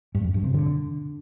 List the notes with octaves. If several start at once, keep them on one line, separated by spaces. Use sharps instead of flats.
G2
F2
G2
C3
D3